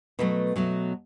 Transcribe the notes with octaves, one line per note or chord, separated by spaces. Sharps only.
B2 F#3 A3 B4
B2 F#3 A3